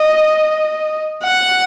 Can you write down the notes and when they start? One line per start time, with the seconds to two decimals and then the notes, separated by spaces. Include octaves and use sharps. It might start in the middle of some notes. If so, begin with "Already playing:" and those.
Already playing: D#5
1.24 F#5